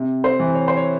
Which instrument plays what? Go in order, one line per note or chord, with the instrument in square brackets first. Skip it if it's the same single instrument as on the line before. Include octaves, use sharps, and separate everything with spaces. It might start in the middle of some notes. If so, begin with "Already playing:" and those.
Already playing: [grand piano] C3
C5
E3
C#5
C5
C#5